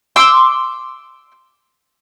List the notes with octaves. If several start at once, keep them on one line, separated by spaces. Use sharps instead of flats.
C6 D6 E6